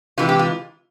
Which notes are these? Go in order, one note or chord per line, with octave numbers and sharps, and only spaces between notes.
C3 E3 G#3 F4
G4
F4